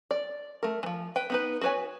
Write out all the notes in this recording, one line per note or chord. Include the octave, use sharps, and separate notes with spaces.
D5
A3 A#4
E3 F3
B4 G5
B3 D#4 B4
F#4 G#4 B4 C#5 G#5